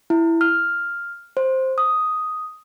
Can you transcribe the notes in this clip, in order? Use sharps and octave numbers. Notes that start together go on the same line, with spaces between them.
E4
F6
C5
D#6